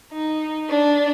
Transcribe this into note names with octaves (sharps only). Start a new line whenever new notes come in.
D#4
D4